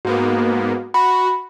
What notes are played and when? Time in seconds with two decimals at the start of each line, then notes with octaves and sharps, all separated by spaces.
0.05 G#2 A#3 B3 F#4
0.94 F#4 B5